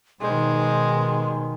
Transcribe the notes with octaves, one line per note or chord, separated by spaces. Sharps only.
G#2 B2 D#3 G3 G#3 C5 C6